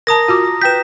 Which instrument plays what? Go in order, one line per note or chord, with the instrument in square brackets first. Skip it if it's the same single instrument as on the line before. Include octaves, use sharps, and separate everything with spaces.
[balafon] A#4 A5 [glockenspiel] A#5 D#6 A#6
[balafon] F4 F#4 D6
[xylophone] B4 G5 G6 [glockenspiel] B6 E7